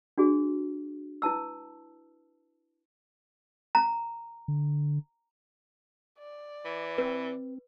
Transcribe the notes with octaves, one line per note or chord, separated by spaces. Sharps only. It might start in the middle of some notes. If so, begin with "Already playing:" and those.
D4 F#4 G#4
E4 B4 A5 E6
A#5
D3
D5
E3
C4 B4